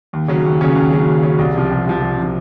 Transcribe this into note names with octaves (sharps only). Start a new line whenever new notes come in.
D#2
C#3 F#3 C#4
D#2
C#3 F#3 C#4
D#2
C#3 F#3 C#4
D#2
C#3 F#3 C#4
C2
C3 F3
C2
C3 F3
C2
C3 F3